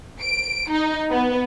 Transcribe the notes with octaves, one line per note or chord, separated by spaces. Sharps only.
D7
D#4
B3